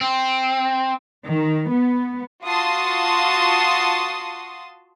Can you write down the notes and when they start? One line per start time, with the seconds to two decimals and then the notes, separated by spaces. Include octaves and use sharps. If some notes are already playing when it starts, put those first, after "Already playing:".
0.01 C4
1.27 D#3
1.72 B3
2.44 F4 F#4 A5 C6 D#6